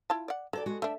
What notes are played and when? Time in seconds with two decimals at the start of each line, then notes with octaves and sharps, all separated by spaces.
0.10 E4 F4 A5
0.28 D5 F#5
0.53 F#3 A4 C5 D5
0.66 G#3 F#4
0.82 A3 D4 E5